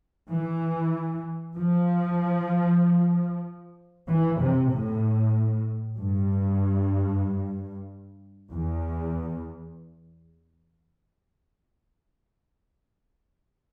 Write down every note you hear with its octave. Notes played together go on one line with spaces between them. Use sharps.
E3
F3
E3
C3
A2
G2
E2